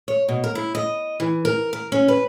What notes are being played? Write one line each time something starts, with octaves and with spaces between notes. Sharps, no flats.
C#5
B2
A#4
E4
D#5
E3
A#4
A#4
C#4
B4